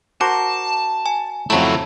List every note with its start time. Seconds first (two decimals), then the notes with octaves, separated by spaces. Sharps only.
0.21 F#4 A#4 C5 A5 D6
1.06 G#5
1.50 F2 C#3 F#3 A3 E4 A5 A#5